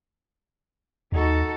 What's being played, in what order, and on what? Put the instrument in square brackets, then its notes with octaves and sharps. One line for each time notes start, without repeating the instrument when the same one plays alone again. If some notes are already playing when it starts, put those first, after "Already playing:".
[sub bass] D#2 [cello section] D#4 F#4 A4